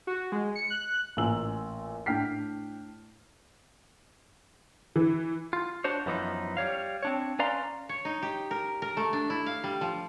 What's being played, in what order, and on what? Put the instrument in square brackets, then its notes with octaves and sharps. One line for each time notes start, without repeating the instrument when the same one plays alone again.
[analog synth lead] F#4
G#3
C#7
F#6
[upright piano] A1 A#2 A#4 G#5 E6 F#7
A2 D4 G5 F6 B6 C7
[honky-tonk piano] E3
[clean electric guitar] F4
D4 F#4 C5 C#5
F#2 E3 F3 B3 D#4
G3 C#5 F5
C4 D4 C#5
C#4 B4 D5 F5 A#5 C6
[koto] C#5
D#4
G4
A#4
A#4
A3
D4
E4
F5
G3
F3